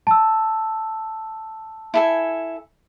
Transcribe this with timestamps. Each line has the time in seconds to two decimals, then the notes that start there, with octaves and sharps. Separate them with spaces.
0.07 A5 E6
1.94 E4 A4 G#5